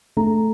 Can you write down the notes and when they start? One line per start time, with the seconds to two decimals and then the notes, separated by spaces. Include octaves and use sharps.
0.17 A3 A#5